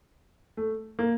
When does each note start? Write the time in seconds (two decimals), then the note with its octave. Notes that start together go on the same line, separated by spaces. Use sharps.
0.57 A3
0.99 A#3